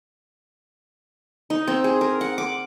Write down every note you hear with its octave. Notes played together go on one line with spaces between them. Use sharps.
D#4
C4
G#4
A#4
F#5
D6